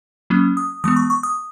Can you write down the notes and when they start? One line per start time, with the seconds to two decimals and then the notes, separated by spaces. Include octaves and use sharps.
0.30 F#3 A#3 C#4
0.57 D#6
0.84 E3 G#3 B3 D#6
0.96 C#6
1.10 C#6
1.23 D#6